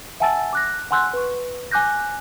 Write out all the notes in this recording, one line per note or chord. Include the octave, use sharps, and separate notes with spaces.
E5 F#5 G#5 A5 E6 A6
D6 F#6 A#6
F#5 G#5 C6 E6 F#6 G6
B4 C#6
G#5 D6 F#6 G6 A#6